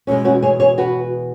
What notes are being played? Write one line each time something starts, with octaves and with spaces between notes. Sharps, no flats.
E2 B2 G#3 C#4
C#4 F#4
G#4 C#5
G#4 C#5
F#4 B4